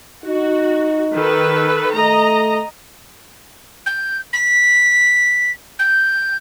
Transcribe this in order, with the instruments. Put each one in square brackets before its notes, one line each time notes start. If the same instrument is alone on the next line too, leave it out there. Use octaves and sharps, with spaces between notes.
[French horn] D#4 [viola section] F#4
[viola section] D#3 A4 B4
[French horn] A3 [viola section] D#5 A#5
[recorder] G6
B6
G6